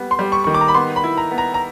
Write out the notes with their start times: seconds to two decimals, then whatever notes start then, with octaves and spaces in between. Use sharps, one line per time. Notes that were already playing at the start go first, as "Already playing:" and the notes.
Already playing: G3 B3
0.11 C6
0.19 G3
0.32 C#6
0.44 D#3 C#6
0.54 D6
0.61 A#5
0.68 B5
0.74 B3 C6
0.96 B5
1.04 E4
1.17 A#5
1.31 B3
1.38 A#5
1.54 A#5